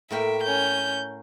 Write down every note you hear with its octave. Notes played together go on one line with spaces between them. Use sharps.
A2 A#3 E5 G5
C#4 G6